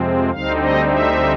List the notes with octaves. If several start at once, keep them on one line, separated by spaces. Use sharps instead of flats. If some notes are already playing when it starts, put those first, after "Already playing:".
Already playing: F2 C3 F3 G#3 C4
D2 D3 G3 C4 D#4 F5
D#5
E5